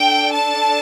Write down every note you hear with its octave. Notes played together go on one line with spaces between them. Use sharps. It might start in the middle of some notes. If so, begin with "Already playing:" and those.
Already playing: D4 A4 G5
A5